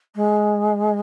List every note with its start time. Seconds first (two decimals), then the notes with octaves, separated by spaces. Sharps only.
0.15 G#3